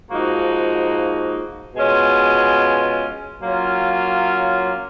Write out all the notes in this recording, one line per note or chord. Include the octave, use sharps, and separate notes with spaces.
G#2 F3 A#3 D#4 F#4
B2 G#3 C#4 F4
F#3 A#3 C#4 F4